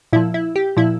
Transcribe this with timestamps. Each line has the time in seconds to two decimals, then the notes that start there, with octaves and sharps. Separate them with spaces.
0.13 A#2 F3 E4
0.34 E4
0.56 G4
0.77 A#2 F3 E4